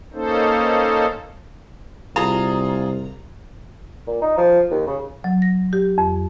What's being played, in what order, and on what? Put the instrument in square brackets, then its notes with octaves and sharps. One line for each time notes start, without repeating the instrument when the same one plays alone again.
[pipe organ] A#3 C#4 D#4 A4 C5
[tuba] C2 [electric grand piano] F4 G#4 [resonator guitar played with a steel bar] A#5
[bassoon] A#2
D#4
F3
D#2
C#3
[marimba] F#3
A#6
G4
F2